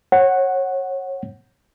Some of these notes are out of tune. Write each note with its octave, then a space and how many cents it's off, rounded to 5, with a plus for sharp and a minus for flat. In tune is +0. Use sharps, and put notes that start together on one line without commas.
C#5 -25 F#5 +0